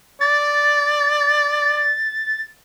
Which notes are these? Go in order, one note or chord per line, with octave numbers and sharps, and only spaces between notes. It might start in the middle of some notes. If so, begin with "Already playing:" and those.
D5 A6